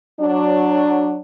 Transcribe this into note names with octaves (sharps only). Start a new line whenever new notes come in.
F#3 D4